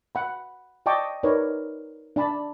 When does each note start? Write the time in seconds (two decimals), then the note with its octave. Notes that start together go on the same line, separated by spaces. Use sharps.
0.15 F#5 B5
0.86 D5 D#5 G5 A5 C#6 D6
1.23 D#4 A#4 B4 C#5 D5
2.16 D4 D5 A5 B5